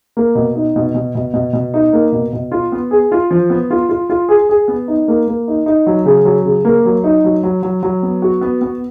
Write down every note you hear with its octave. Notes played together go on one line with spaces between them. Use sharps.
A#3
B2
D#4
B2
B2
B2
B2
B2
D#4
A#3
B2
B2
F4
B3
G#4
F4
F3
B3
F4
F4
F4
G#4
G#4
B3
D#4
A#3
A#3
D#4
D#4
F#3
C#3
F#3
C#3
A#3
F#3
D#4
F#3
F#3
F#3
F#3
B3
F#4
B3
B3